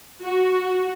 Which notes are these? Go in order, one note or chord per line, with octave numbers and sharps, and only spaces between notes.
F#4